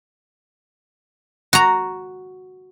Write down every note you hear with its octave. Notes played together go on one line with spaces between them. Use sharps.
F#4 A#5